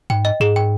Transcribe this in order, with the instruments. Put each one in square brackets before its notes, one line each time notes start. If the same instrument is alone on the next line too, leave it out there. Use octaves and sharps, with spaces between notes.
[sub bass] G#2 [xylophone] G5
[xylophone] D#5
[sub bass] G#2 [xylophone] G#4
[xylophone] G5